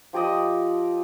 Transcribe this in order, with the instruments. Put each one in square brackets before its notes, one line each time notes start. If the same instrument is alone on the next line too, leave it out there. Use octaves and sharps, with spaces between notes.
[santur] F3 G4 D5 D#5